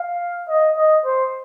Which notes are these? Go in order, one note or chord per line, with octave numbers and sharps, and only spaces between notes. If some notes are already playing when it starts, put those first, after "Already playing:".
Already playing: F5
D#5
D#5
C5